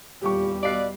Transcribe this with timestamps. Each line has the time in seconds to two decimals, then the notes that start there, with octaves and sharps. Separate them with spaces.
0.22 D#1 E2 G3 F4 G4 C#6
0.63 B2 B4 D5 D#5 F5 C7